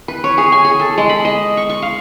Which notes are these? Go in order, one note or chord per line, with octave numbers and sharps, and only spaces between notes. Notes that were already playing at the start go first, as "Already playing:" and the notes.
B4
C#5
G#4
G#5
G#4
A4
G#3
B5
D#5
C#6
C#6
F5